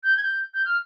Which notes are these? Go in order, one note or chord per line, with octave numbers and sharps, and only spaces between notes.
G6
G#6
G6
G6
F6